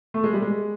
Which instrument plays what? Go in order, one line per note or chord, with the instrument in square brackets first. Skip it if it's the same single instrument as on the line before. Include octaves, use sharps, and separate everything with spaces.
[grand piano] A3
G#3
G3
G#3